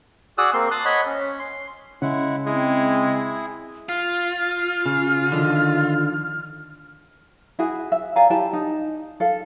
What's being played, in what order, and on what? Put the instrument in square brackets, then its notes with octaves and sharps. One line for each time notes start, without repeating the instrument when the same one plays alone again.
[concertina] F#4 G#4 D5 D#6 E6 F#6
A#3 C4 C6
A5 C6 D#6 F#6
C#5 D#5 F#5 B5
C#4
C6
[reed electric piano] C#3 C#4 [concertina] G#3 E4 F#5
[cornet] G#3 [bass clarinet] C4 [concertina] E4 G#4
[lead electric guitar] F4 [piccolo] F6
[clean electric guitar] C#3
D3 D#3 F3
[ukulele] E4 F#4 G#4
E5
D5 F5 G#5 A#5
E4 G4 G5 A5
D#4
A4 F5